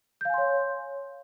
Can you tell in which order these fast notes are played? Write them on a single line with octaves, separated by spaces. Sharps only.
G6 F5 G#5 C6 C#5